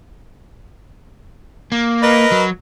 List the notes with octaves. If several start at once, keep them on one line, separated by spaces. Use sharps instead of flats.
A#3
A#4 B4 D#5
F#3